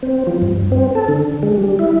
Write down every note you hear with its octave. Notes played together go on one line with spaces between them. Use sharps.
C4
F3
G2
C4
A4
D3
G#3
G3
E4